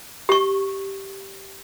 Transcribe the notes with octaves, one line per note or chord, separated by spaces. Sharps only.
G4 C#6